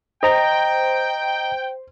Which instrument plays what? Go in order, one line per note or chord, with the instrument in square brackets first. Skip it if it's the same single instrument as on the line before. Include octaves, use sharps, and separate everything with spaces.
[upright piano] C5 [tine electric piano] D#5 A#5 A#6 [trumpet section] G5